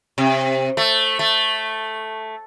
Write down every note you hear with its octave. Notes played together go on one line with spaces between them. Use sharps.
C3
A3
A3